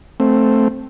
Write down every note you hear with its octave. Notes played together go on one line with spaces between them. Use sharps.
A3 C4